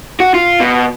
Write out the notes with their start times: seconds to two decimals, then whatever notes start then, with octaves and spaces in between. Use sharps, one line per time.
0.20 F#4
0.34 F4
0.60 B2